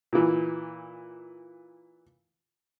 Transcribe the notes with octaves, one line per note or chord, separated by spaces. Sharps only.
A#2 E3